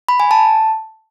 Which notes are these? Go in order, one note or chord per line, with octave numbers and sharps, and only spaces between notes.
B5
G#5
A5